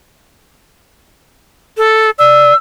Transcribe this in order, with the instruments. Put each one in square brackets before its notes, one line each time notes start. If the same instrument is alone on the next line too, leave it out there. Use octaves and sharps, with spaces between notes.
[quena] A4
[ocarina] D5 [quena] E6